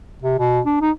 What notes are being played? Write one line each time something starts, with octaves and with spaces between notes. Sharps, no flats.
C3
B2
D4
D#4